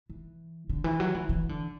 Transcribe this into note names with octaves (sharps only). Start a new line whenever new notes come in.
E3
D3
E3
F#3
E3
E3
D3